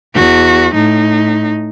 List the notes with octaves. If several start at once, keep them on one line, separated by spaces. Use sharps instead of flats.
E2 F#4
A2 D#4